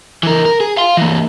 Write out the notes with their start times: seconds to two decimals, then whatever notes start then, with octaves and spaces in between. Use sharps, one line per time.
0.23 E3 A#4
0.45 A#4
0.60 G#4
0.77 F5 C6
0.97 E3 A#3